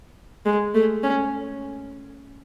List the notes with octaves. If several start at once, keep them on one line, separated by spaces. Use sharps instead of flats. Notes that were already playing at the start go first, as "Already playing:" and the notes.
G#3
A3
C#4